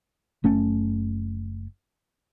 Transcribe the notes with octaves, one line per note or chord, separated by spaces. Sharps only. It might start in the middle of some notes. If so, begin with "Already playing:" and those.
F#1 A3 C#4